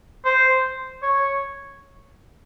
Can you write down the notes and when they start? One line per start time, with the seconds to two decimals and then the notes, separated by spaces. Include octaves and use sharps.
0.25 C5
1.02 C#5